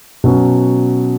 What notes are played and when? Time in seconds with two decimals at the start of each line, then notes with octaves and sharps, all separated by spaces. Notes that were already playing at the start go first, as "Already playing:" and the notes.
0.24 B2 F#3 C#4